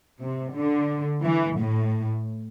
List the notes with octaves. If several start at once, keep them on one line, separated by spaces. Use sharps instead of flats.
C3
D3
E3
A2